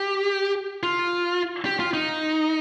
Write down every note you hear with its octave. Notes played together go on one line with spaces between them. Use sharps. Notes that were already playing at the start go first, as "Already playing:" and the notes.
Already playing: G4
F4
G4
F4
D#4